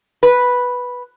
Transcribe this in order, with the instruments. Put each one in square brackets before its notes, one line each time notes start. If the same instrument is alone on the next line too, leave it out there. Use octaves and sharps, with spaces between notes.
[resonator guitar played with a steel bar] B4